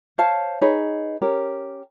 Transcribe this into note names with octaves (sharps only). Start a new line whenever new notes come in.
C5 C#5 F5 A5
D#4 G#4 B4 C#5
C#4 G4 A#4